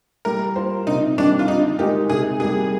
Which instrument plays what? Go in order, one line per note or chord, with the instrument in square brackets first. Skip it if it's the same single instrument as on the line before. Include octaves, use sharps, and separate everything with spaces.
[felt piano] G3 [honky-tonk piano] A#4
[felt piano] A#3 F4 C5
[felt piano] C3 [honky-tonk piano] D#4
[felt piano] D#3 G3 [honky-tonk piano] D4
[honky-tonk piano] F4
[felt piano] D3 [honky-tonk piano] D#4
[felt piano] G#3 D#4 A#4 [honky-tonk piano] G4
[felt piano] C3 [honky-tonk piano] G#4
[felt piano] G3 A#3 [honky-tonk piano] G#4